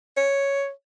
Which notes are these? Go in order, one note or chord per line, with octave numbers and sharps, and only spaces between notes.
C#5